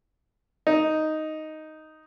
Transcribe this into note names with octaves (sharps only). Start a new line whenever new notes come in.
D#4